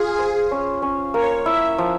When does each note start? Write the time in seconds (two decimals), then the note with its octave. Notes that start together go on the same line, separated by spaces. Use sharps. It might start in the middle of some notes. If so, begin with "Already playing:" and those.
Already playing: F4 G#4
0.19 C5
0.51 C#4
0.82 C#4
1.14 A#3 C#5
1.46 E4 E5
1.78 F3